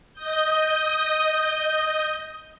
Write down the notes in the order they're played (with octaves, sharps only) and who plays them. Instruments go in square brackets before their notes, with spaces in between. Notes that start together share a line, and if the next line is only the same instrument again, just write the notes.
[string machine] D#5 D#6 G6